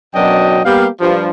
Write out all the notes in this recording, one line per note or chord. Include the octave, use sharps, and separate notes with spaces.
F#2 B2 F#3 D4 D#5 G5
G3 A#3 B3 G4 F5
G2 F3